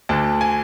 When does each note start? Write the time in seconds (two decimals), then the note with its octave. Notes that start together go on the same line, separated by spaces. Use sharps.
0.09 D2 D3 A5
0.41 G#5